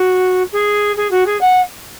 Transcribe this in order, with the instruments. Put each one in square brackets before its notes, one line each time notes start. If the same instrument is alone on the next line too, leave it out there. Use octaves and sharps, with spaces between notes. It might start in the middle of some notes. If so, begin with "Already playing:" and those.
Already playing: [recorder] F#4
G#4
G#4
F#4
G#4
F#5